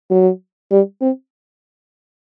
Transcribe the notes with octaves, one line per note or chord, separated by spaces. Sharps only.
F#3
G3
C4